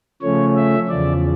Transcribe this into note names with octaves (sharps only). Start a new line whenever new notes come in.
C#3 F3 A3 C#4 C#5
E5
E2 C#3 F3 D5